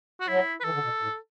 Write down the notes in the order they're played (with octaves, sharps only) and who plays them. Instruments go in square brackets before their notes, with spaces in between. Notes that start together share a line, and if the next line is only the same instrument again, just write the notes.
[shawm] F#4
[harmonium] F#3 [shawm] E4
[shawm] B4
[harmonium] E3 [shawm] A4
[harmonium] D3
B2
A2